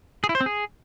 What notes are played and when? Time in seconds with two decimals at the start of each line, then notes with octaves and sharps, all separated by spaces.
0.24 G#4
0.29 E4
0.35 C5
0.41 C4
0.46 G#4